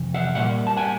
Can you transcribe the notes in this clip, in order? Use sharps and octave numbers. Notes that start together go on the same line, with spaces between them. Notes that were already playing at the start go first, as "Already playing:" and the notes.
Already playing: F2 C3 E3
E5 F#5
A#2 G3 A#3 E5 F#5
A5
F#5 G#5